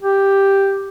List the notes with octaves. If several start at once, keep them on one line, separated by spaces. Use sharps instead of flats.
G4